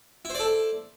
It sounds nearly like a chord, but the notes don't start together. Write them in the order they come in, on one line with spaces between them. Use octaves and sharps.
E4 C5 D5 A4